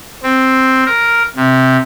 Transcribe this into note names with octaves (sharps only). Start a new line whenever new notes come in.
C4
A#4
C3